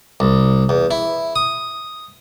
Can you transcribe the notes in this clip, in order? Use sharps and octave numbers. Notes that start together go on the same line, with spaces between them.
C2
E2
E4
D#6